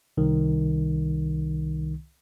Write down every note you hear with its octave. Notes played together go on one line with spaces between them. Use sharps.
C2 D#3